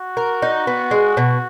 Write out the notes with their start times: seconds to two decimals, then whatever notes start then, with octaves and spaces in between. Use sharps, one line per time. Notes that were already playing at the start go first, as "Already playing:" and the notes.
Already playing: F#4
0.17 A#4
0.42 D#4
0.67 B3
0.91 G#3
1.17 B2